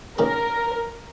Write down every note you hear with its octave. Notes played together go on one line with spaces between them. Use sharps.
G#2 D#3 A#3 C#4 G#4 A#4